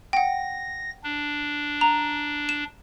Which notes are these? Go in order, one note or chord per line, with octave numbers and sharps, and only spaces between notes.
F#5 G5 A#6
D4
A#5
E7